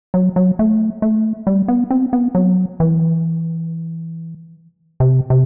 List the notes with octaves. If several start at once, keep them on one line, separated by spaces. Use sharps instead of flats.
F#3
F#3
A3
A3
G3
B3
C4
B3
F#3
E3
C3
C3